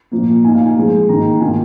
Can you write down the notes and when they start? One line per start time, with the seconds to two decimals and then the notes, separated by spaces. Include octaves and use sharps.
0.12 A#2 F3 A#3
0.44 A#2 A#3 D#4 G#5
0.55 F5
0.65 G#5
0.77 F3 G#3 F4
1.09 D#3 A#3 D#4 A#5
1.41 D#3 A#3 F4 G#5